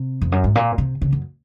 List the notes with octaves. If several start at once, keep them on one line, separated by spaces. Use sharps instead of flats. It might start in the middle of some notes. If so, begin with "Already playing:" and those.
Already playing: C3
F2
F#2
G#2
A#2
C3
C#3
F#2